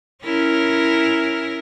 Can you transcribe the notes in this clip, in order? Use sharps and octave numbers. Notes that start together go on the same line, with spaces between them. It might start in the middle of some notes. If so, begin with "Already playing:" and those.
C#4 E4 A#4